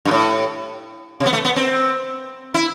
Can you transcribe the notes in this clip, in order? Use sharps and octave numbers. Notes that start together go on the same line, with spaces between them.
G2
A2
C3
B3
A3
B3
C4
E4